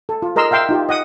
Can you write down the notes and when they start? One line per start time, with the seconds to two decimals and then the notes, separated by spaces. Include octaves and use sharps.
0.09 A4
0.22 F4
0.36 G#4 A#4 D#5 A#5 C6 E6
0.51 E5 F5 G5 C6 E6
0.69 D#4 F4 G4
0.89 D#5 F#5 D#6